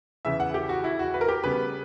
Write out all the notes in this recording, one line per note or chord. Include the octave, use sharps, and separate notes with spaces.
E2 C#3 E3 E5
F#5
G4
F#4
E4
F#4
B4
A#4
G4
C#3 G3 B3 B4